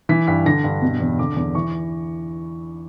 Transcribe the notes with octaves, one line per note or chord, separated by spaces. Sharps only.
E3 B6
G2 B6
D3 A#6
G2
B2
E2
D3 D6
E2 D6
E3 C#6